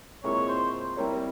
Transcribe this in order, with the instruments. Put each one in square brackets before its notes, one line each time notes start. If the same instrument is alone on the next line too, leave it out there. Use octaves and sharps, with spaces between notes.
[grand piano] A#2 G#3 C4 E4 A#4 [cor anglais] C#5
[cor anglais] C5
[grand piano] G3 C4 E4 A#4 C#5